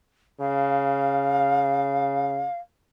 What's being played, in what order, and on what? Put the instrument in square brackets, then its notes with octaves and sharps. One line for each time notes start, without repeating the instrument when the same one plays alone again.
[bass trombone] C#3 [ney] F5